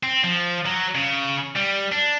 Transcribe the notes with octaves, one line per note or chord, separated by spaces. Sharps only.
C4
F3
F#3
C#3
G3
D4